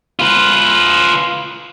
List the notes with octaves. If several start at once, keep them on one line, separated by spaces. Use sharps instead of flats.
F4 B4